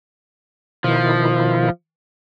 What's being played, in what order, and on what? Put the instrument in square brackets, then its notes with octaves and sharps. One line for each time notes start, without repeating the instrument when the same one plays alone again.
[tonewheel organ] B2 D#3 E4 [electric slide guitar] F3